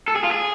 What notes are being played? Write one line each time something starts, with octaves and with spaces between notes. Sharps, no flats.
A4
G#4
F4
G#4